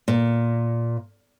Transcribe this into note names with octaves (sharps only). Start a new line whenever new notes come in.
A#2